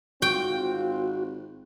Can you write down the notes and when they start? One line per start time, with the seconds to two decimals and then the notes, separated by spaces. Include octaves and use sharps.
0.22 G#1 C4 F4 F#4 G5